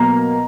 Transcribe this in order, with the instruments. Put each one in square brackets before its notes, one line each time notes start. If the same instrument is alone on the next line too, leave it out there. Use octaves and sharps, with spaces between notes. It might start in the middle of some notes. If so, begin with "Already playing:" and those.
Already playing: [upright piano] B2 F#3 A#3 A#5